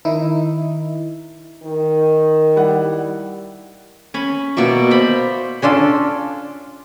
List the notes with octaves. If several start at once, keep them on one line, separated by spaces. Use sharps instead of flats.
D#3 D#4 E4
D#3
G3 E4 F#5
C#4 B5
B2 A#3 D5 E5
C5 B5
C#4 D4 F4 A4